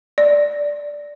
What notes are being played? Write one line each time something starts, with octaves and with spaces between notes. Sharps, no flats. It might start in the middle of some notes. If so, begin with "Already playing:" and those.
D5